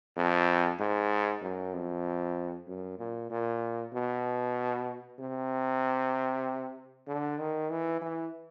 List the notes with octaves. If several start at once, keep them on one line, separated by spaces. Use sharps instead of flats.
F2
G#2
F#2
F2
F#2
A#2
A#2
B2
C3
D3
D#3
E3
E3